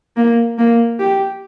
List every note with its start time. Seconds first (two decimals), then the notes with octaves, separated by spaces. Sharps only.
0.17 A#3
0.58 A#3
0.99 G4